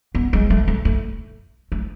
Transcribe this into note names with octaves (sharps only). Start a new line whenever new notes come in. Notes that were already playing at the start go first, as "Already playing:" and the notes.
B3
G#3
A3
A3
A3
A3